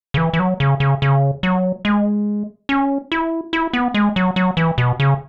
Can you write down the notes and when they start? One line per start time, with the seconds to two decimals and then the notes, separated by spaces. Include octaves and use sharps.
0.14 C#3
0.17 E3
0.33 E3
0.39 F#3
0.60 C#3
0.80 C#3
1.02 C#3
1.43 F#3
1.85 G#3
2.69 C#4
3.12 E4
3.53 E4
3.73 B3
3.94 G#3
4.16 F#3
4.36 F#3
4.57 E3
4.78 B2
5.00 C#3